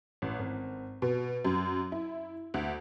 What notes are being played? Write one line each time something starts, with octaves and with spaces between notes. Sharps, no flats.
A1
G#1
B2
F#2
E4
D2